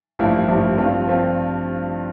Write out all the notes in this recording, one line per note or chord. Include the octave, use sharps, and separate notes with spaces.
A1 G2 F3 A#3 E4
A1 G2 F3 A#3 E4
G2 F3 C4 F4
F3 C4 F4